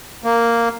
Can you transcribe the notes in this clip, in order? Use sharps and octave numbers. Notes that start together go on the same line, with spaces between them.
A#3